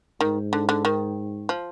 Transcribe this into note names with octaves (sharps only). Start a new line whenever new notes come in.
G#2 D#3
D3
D3
D#3
F3